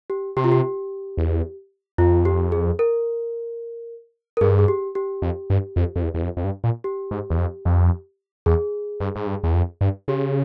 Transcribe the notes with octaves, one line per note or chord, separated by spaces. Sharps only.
G4
C3 G4
F4
G4
E2
F2 F4
G4
G#4
A#4
A#4
G2 G#4
G#4
G4
G4
F2
G2
F2
F2
E2
E2
F2
F2
G2
A#2
G4
G#2
E2
F2
F2
E2 G#4
G2
G#2
G2
E2
F2
G2
C#3 G4